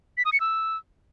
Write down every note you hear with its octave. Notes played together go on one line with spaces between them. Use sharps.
B6
D#6
C#7
E6